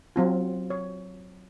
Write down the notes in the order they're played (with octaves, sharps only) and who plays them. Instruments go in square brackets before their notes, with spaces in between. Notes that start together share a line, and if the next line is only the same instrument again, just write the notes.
[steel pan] F#3 C4 F4
C#5